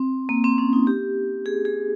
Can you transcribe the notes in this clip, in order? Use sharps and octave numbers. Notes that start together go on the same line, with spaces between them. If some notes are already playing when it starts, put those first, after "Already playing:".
Already playing: C4
A#3
C4
C#4
D#4
G4
G#4
G#4